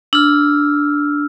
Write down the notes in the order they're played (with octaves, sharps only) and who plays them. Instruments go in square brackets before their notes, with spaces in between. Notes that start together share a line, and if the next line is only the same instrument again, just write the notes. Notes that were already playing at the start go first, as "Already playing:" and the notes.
[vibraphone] D4 [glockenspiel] E6 F6